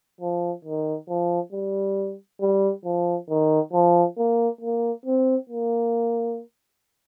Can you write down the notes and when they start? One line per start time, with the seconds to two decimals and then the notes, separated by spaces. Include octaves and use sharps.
0.21 F3
0.65 D#3
1.09 F3
1.53 G3
2.41 G3
2.85 F3
3.29 D#3
3.73 F3
4.18 A#3
4.61 A#3
5.06 C4
5.50 A#3